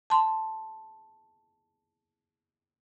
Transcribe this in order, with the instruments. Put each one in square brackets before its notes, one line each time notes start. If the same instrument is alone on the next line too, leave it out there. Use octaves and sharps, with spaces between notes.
[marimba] A5 C6